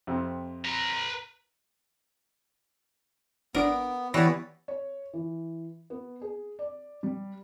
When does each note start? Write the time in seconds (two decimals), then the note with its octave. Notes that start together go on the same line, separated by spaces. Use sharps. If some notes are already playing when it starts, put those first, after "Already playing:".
0.07 F2 C3
0.65 B4 A#5
3.55 G#1 B3 D4 A#4 D7
4.14 E3 G3 B3 E4 B4 C#5 A6 A#6
4.68 C#5
5.13 E3
5.90 B3
6.21 G#4
6.59 D5
7.03 G3